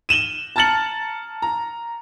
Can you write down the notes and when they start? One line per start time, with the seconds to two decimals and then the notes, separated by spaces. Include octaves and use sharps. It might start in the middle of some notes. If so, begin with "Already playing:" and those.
0.09 D#7 E7 F#7 G7
0.56 A5 A#5 F6 A6 C#7 F#7
1.42 A#5